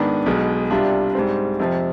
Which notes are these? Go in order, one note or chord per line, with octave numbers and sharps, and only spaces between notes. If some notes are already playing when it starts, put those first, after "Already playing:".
Already playing: G#2 D#3 B3 D4
B1 B2 G#3
C2 C3 G3 D4 F4
G#2 G3 C4
F2 C3 F3